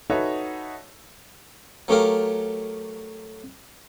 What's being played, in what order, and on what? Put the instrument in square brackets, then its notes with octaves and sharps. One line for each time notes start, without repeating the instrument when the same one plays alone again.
[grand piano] D#4 F#4 A4 B4 C#5 E5
[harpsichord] F#3 A3 G4 A#4 F5